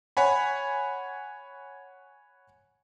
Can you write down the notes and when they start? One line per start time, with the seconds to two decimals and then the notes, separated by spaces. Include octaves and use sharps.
0.17 C#5 F#5 G#5 B5